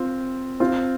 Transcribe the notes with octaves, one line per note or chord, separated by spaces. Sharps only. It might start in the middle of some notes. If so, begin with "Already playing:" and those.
Already playing: C4 F4
C4 F4